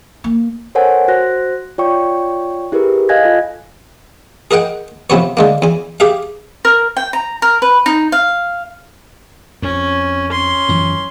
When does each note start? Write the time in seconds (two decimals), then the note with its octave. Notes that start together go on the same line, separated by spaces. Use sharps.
0.24 A#3
0.75 A4 A#4 C5 C#5 F#5 G#5
1.08 F#4 C5 F#6 A#6
1.78 F4 C#5 D5 G5 C#6
2.72 E4 G4 G#4 A#4 B4
3.09 D#5 F5 G#5 F#6 G#6 A#6
3.23 F4 A4
4.51 G#4 A#4 D#5 F#5 G5
5.10 F2 C3 B3 C#5
5.37 D3 G#3 A#3
5.62 E2 G#5
6.00 G4 G#4 E5 F5
6.65 A#4
6.97 G5
7.13 A#5
7.42 A#4
7.62 B4
7.86 D#4
8.12 F5
9.62 F2 C#4
10.32 C#4 C6
10.69 F#2 E3 F3